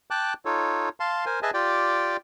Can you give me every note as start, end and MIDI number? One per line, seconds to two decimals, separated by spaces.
0.11 0.34 79
0.11 0.34 81
0.11 0.34 86
0.11 0.34 90
0.45 0.89 63
0.45 0.89 65
0.45 0.89 69
0.45 0.89 73
1.00 1.25 77
1.00 1.25 81
1.00 1.25 84
1.26 1.40 70
1.26 1.40 72
1.26 1.40 80
1.42 1.51 68
1.42 1.51 71
1.42 1.51 75
1.42 1.51 76
1.42 1.51 80
1.42 1.51 81
1.54 2.17 65
1.54 2.17 67
1.54 2.17 74
1.54 2.17 79